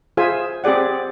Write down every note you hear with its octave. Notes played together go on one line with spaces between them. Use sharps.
F4 G#4 C5 E5 G#5
C4 G4 G#4 D5 F#5